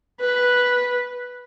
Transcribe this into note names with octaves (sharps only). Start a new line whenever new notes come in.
B4